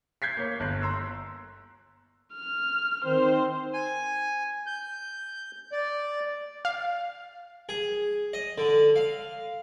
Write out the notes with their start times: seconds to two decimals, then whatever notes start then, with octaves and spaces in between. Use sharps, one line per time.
0.22 G6 G#6 B6 C7
0.37 A#3 C#5
0.60 G1 F#6
0.82 A#5 C6 E6
2.33 F6
3.05 D#3 C4 C5
3.74 G#5
4.66 G6
5.72 D5
6.65 F5
7.69 G#4
8.33 D#5
8.58 D3
8.96 F5